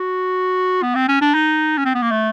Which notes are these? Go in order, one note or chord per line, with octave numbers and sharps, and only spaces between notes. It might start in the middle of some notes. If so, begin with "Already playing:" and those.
Already playing: F#4
B3
C4
C#4
D4
D#4
C#4
C4
B3
A#3
A3